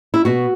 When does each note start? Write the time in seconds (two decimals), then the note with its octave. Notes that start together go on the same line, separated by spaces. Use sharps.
0.14 E4
0.25 B2 F#4